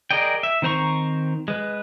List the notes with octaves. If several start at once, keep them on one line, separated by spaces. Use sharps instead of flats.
G#4 A#4 D5 D#5 G5
E5
D#3 C4 C5 A#5 C#6
G#3 B4